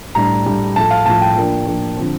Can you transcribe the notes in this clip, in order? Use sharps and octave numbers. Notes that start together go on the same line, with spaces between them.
A2 G3 D4 A#5
A2 G3 D4
A2 F3 A3 A5
F5
A2 F3 A3 A5
G5
F3 A#3 D4
F3 A#3 D4
D3 F3 C4